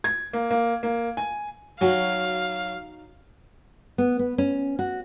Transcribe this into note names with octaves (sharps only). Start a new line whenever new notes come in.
G#6
A#3
A#3
A#3
G#5
F#3 D#4 F#4 F5 G#5
B3
B3
C#4
F#4